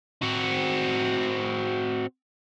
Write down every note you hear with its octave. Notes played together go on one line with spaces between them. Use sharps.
C4 F#4